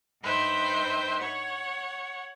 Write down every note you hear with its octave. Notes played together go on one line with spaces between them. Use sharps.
G2 D#4 B4 C5 E5 G5
C#5 F#5